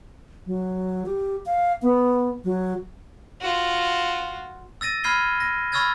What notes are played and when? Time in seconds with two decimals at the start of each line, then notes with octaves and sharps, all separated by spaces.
0.46 F#3
1.06 G4
1.46 F5
1.82 B3
2.44 F#3
3.41 F4 F#4
4.81 E6 A6 A#6 D#7
5.04 B5 F6 G#6 C7 D#7 G7
5.40 A#6
5.72 B5 C#6 E6 F6 G#6 A6